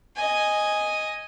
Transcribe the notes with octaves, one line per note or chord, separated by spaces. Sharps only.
D#5 G#5